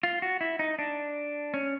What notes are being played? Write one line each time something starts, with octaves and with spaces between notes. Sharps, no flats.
F4
F#4
E4
D#4
D4
C#4